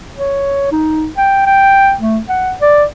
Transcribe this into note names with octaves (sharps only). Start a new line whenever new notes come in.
C#5
D#4
G5
G5
A3
F#5
D5